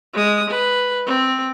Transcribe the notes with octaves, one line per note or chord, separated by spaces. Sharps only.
G#3 D#6
B4
C4